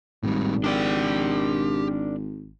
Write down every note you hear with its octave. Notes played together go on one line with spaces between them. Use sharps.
G#1 A2 G3
D4 G4 A#4 D5